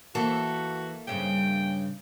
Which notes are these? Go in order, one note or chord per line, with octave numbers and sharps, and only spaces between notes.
E3 A#3 F#4 A4 E5
G2 C#3 C#4 G5